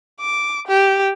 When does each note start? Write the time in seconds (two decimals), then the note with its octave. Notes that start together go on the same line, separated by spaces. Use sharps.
0.20 D6
0.67 G4